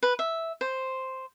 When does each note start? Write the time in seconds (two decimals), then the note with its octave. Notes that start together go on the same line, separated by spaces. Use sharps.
0.03 B4
0.19 E5
0.61 C5